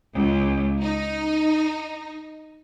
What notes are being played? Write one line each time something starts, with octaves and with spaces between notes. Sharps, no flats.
C#2
D#4